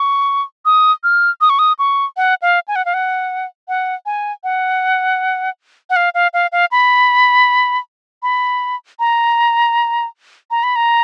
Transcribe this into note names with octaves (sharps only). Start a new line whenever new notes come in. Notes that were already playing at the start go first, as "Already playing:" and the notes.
Already playing: C#6
D#6
F6
D#6
C#6
D#6
C#6
F#5
F5
G#5
F#5
F5
F#5
F#5
G#5
F#5
F#5
F5
F5
F5
F5
B5
B5
A#5
A#5
B5
A#5